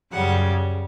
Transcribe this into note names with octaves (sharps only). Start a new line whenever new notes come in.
F#2 C#3 G3 F#5